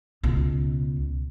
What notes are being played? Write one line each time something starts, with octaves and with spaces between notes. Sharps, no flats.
C#2 B2